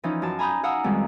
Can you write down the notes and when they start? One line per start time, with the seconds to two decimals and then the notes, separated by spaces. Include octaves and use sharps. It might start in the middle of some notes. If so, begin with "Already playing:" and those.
0.04 E3 F3 C#4 D#4
0.22 F#2 A5
0.39 G#5 A#5 B5 D#6 G6
0.63 F5 F#5 A#5 D#6 E6
0.84 F2 D#3 G3 G#3